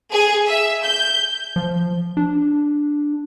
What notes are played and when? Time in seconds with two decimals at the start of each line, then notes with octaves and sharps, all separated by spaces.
0.11 G#4
0.47 E5
0.84 G6
1.56 F3
2.17 D4